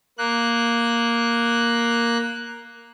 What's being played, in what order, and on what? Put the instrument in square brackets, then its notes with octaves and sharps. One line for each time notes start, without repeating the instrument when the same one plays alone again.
[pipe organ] A#3 F#6